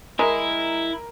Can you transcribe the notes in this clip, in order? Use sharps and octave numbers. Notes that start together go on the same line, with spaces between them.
G#3 E4 A#4